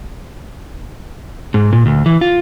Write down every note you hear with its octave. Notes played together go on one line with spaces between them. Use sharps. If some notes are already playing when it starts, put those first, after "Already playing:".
G#2
A#2
D2
E3
F4